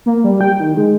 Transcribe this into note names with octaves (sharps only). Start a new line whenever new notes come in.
A#3
G3
G5
D#3
G#3